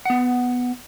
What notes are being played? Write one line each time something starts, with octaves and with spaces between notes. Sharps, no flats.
B3 F#5